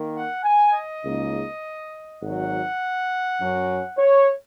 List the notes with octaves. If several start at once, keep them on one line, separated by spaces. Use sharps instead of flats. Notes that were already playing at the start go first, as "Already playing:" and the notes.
Already playing: D#3 A#3
F#5
G#5
D#5
C#2 C#3 A#3 D#4
G#1 G#2 F#3 F#5
F#2 F#3 C#4
C#5